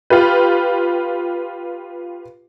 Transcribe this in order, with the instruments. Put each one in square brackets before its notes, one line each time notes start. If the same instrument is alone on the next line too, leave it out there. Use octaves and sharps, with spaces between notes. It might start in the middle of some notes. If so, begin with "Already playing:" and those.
[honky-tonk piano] F4 G4 B4